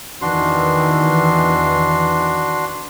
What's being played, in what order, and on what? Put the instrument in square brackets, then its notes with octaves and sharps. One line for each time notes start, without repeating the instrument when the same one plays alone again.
[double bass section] E2 D#3 E3 [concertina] D4 F#4 C6